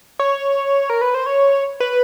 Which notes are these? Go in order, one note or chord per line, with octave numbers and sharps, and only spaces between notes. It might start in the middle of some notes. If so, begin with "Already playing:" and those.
C#5
A#4
B4
C5
C#5
B4